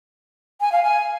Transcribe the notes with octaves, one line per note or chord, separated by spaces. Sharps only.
G#5
F5
G#5